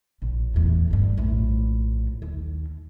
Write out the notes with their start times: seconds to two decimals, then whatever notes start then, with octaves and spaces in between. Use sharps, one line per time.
0.22 A#1
0.54 E2 A2
0.91 E2 G2
1.17 A#1 A2
2.22 D#2